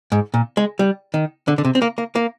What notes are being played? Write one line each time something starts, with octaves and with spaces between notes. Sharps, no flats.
G#2
A#2
G#3
G3
D#3
D3
D3
C3
C4
A#3
A#3
A#3